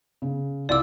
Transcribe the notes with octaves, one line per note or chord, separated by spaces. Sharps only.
C#3
C2 F4 D5 D6 E6